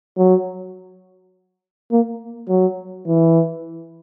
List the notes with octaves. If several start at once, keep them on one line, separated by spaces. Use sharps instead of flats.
F#3
A#3
F#3
E3